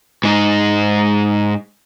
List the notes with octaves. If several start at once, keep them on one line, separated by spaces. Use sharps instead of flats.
G#2 D#4